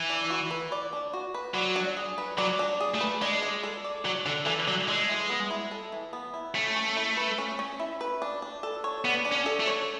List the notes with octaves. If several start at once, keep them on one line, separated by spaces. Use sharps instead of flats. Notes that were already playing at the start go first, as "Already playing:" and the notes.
Already playing: E3
D4
F#4
B4
D5
D4
F#4
B4
F#3 D5
D4
G#4
B4
F#3 D5
D4
G#4
A3
B4
G#3 D4
D4
A4
D5
F#3 D4
D3 D4
E3 A4
F#3 D5
G#3 A4
E3
B3
E4
A4
E3
B3
E4
A3 C#4
C#4
E4
B4
C#4
C#4
E4
B4
D4
D4
A4
C#5
B3 D4
D4
C#4
A4
A3
C#5